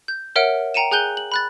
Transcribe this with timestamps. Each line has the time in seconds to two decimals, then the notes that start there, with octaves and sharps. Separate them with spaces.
0.08 G6
0.36 A#4 C#5 E5 F#5 F6 D7
0.74 G5 A#5 C#7 D#7 E7
0.91 G#4 G#5 F#6 G6 G7
1.17 F#7
1.32 B5 F#6 A6